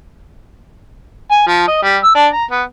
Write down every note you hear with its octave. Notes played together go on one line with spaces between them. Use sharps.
G#5
F3
D#5
G3
E6
D4
A#5
B3